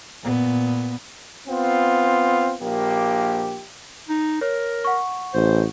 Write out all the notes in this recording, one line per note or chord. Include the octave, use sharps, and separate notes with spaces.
A#2 B3
B3 C4 F4
A#1 A#3 G4
D#4
A#4 C#5
F#5 C#6
A1 C5